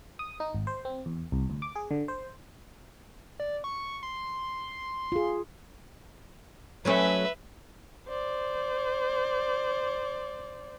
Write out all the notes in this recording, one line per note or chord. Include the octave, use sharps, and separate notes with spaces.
D#6
D#4
G#1
C5
C4
E2
C2
D2
D6
G#4
D3
C5
D5
C#6
C6
F4 G#4
F#3 A3 C#4 B4 E5
C5 D5